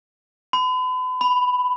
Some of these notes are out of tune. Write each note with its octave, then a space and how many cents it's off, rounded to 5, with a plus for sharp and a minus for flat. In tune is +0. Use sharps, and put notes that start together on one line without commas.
B5 +40
B5 +10